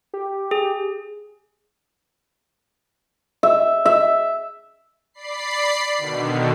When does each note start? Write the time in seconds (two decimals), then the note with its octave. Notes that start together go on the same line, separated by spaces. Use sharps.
0.14 G4
0.51 G#4
3.43 E5
3.85 E5
5.14 D5 B5 C7
5.98 B2 D3 D#3